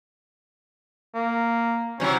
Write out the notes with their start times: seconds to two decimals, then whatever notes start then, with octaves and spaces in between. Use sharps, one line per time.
1.15 A#3
2.00 C3 F#3 C#4 E4